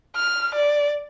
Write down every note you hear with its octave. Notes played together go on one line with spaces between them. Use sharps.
F6
D5